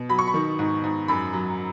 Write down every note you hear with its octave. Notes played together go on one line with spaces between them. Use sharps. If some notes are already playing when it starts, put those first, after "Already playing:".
Already playing: B2
F#3 B5
C#6
B5
D#3
G#2
G#2
F#2 B5
F#3